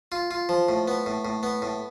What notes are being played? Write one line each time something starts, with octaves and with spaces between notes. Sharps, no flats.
F4
F4
F3
A2
B3
A2
A2
B3
A2